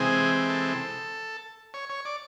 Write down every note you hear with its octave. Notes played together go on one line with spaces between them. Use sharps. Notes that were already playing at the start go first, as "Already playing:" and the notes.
Already playing: C3 E3 G#3 C4 G#4
A4
C#5
C#5
D5